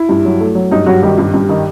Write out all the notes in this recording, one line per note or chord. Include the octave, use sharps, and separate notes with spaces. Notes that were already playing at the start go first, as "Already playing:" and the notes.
Already playing: E4
G2
F#3
A3
F#3
G2 D#4
G2 F#3 F#4
D#3 G3 G4
G2
G2
D#3